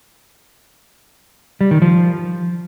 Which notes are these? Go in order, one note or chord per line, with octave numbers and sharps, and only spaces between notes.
G3
D#3
F3